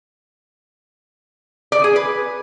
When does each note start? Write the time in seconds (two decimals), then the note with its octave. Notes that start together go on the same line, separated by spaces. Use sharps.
1.72 D5
1.84 G#4
1.96 B4